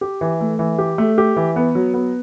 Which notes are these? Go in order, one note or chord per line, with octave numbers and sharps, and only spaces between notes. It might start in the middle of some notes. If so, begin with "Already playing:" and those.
G4
E3
A3
E3
G4
A3
G4
E3
B3
F#3
B3